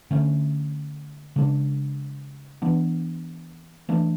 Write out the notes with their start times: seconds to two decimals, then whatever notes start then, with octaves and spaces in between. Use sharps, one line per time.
0.11 D3 A3 C#4
1.36 C#3 G#3 D4
2.62 E3 B3 D4
3.89 E3 A3 D4